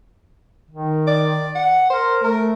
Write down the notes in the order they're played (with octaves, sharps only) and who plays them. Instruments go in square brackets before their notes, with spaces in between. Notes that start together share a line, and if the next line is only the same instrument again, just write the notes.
[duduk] D#3
[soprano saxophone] D5
F#5
[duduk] A#4 [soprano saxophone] C5
[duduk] A3 [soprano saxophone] A#4